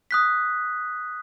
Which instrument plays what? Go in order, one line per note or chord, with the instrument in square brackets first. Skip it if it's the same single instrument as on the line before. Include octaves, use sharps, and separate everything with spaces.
[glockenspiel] D#6 F#6 B6